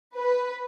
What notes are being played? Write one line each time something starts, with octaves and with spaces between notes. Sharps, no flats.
B4